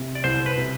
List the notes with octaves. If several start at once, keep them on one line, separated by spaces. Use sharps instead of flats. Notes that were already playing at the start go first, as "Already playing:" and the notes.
Already playing: C3
D5
C2 C5
B4
C3